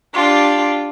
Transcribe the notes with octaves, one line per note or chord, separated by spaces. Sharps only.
D4 F4 G4